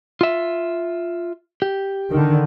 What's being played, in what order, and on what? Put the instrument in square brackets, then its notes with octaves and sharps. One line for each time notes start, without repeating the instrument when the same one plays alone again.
[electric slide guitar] F4 E5
G4
[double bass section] D3 D#3